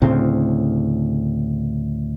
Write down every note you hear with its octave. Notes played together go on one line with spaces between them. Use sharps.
D2 A2 C#3 C4